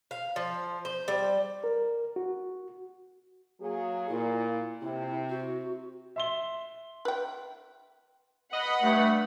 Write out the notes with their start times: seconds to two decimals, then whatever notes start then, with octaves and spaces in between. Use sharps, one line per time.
0.11 F5
0.36 F3
0.85 C5
1.08 G3
1.64 A#4
2.16 F#4
3.61 F#3 A#3 G#4
4.09 A#2 E4
4.81 C3 E4
5.29 F#4
6.16 E5 C6 G7
7.05 B4 G5
8.52 B4 D#5 F#5 B5
8.82 G2 A3